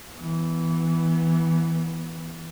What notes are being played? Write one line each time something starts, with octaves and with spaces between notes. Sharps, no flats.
E3 B3